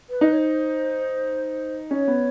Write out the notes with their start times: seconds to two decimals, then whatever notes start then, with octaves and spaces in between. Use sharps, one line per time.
0.10 B4
0.21 D#4
0.33 C#5
0.38 C5
1.91 C#4 C#5
2.08 B3